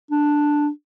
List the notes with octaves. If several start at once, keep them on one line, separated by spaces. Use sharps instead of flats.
D4